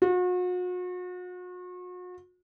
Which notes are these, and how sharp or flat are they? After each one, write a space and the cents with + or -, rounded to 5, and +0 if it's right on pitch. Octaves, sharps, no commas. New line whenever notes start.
F#4 -40